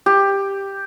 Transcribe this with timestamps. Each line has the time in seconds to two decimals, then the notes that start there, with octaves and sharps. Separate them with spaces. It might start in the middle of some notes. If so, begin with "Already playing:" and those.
0.06 G4